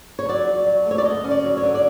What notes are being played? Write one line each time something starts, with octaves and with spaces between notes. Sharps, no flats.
C#5
F#3 D5
F#3
F#3
A3
C#5
D5
D3 D#5
C#4
D5
F#3
C#5
D3
D5